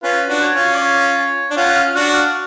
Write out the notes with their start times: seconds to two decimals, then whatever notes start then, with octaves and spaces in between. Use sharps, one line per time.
0.03 C#4 F4 B4
0.28 D4 F#4
0.42 C#5
0.54 C#4 F4
0.74 D5
0.81 C#5
1.51 D4
1.56 C#4 F4 F#5
1.72 F#5
1.76 F5
1.95 D4 F#4 F#5
2.14 F5